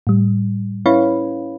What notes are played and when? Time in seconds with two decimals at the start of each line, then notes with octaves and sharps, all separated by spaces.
0.07 A2 G3
0.86 C#4 E4 B4 C#5 F5 B5